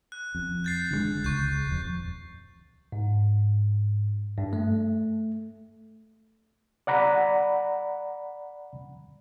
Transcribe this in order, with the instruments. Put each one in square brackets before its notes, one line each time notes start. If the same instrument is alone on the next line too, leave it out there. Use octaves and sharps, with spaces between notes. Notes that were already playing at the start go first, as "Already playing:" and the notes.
[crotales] F#6
[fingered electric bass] F2
[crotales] G6 A6 C7
[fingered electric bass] D3 F3 G#3
[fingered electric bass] C#2 [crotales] C#6 G6
[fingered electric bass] D#1 F2
[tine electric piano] G#2
G2
A3
[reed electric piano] D5 F#5 A#5 B5